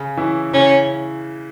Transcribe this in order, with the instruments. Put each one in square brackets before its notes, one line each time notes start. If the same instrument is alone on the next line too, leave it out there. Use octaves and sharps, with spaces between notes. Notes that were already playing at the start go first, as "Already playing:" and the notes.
Already playing: [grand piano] C#3
E3 C#4 E4
[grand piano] C#3 [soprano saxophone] C#4